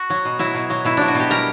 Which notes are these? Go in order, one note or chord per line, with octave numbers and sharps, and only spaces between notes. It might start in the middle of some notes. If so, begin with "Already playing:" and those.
Already playing: F#4
F#3
B2
F#3 E4
B2
F#3
B2 E4
F#3 D4
F#4
B2 G4
G3 A#4